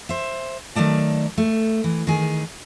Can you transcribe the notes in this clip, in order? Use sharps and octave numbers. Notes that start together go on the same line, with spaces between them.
C5 E5
D#3 F#3 A3 D5 A5
A3
E3
D#3 G#4